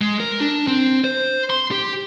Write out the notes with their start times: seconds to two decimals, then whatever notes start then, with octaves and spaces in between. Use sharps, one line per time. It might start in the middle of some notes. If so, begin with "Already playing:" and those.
0.01 G#3
0.20 A#4
0.41 D4
0.68 C4
1.04 C5
1.50 C6
1.71 G4